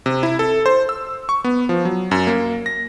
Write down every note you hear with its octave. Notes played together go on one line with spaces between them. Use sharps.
C3
E4
A4
C5
E6
C#6
B3
F3
F#3
F#2
A#3
A#6